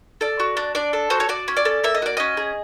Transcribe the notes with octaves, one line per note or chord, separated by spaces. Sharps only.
A4 D5
F#4
D4
D4 D5
A4
F#4 C5
C#5
F#4 D5
C#4
D5
A4
A#3 E5
D#5
F#4 D5
C#4 D#5
G#4